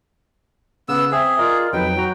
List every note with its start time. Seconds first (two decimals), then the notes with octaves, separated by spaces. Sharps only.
0.89 C#3 B3 E6
1.12 C4 G#4 E5
1.39 F4 A#4 D5 D#5
1.73 F2 F#3 D#4 B4 G5
1.96 F#3 F#4 A#5